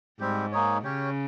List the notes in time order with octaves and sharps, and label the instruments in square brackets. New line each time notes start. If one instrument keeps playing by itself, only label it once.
[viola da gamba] G#2 [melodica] G3 C4 G4
[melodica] A#3 D#4 G#4 C#5
[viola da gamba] C#3 [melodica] C#4 G4 C#5